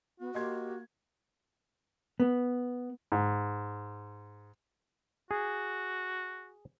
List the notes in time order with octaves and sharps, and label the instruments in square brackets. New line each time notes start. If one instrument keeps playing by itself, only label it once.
[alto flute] B3 [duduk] F#4
[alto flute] A#3 [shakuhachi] G4 [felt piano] D#5 C6 G#6
[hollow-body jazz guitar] B3
[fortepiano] G#2
[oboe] F#4 [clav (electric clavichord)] G#4